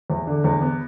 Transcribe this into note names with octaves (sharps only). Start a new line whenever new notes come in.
E2
D3
E2
B3